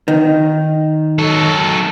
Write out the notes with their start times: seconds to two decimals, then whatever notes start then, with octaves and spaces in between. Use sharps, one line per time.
0.08 D#3
1.19 F#3 A4